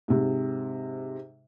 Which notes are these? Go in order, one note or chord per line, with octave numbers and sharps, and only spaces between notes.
G#2 C3